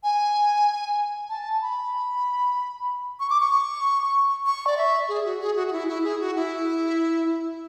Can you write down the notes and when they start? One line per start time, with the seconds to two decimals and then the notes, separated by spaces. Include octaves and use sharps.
0.04 G#5
1.29 A5
1.62 B5
3.20 C#6
3.30 D6
3.41 C#6
4.46 C#6
4.67 D5
4.77 E5
5.09 G#4
5.25 F#4
5.40 G#4
5.56 F#4
5.68 F#4
5.73 E4
5.88 E4
6.04 G#4
6.20 F#4
6.36 E4